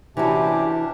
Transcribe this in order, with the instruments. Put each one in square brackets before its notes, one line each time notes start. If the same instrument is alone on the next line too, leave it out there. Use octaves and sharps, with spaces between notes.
[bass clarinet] C3 [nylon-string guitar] E3 E4 F#4 [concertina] C#4 G4 [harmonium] D4